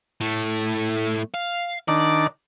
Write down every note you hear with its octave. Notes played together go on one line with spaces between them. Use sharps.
A2 A3
F5
D#3 D4 D5